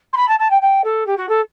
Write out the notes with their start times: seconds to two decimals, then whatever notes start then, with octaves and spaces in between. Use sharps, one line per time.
0.13 C6
0.16 B5
0.28 A5
0.39 A5
0.50 G5
0.62 G5
0.84 A4
1.06 G4
1.17 F#4
1.29 A4